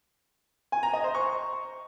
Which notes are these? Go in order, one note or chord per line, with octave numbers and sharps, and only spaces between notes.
G#5
A#5
D#5
C5
C#6